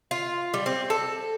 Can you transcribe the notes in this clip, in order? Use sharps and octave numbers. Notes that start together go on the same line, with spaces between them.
F4
G3
C4
A4